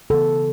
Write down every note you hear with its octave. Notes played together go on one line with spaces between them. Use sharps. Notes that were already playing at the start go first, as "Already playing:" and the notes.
C#3 E3 B3 A4